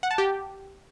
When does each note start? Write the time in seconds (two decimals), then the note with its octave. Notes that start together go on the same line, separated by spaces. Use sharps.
0.03 F#5
0.11 A5
0.18 G4